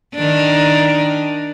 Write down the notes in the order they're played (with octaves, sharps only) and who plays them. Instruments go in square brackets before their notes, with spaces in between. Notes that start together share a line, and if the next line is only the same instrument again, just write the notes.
[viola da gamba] D#3 D4